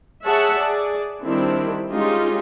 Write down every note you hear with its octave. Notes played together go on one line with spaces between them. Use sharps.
G#4 C#5 E5 F#5 A5
G#4 D5
D#3 G3 C4 D4 E4
G#3 C#4 D#4 F4 G4 G#4